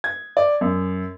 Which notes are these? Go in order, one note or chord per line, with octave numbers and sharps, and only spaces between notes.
G#6
D5
F#2